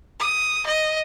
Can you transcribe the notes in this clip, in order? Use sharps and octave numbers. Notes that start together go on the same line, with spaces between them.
D#6
D#5